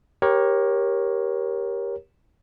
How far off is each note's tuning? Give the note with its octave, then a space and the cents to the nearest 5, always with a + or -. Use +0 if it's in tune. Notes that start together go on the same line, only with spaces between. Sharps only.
G4 +0 A#4 +15 C#5 -15